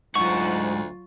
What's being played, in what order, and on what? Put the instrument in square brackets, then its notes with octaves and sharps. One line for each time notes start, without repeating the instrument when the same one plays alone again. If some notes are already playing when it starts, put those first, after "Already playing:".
[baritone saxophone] D2 [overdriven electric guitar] G#2 F#5 [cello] F#3 F4 [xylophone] C#6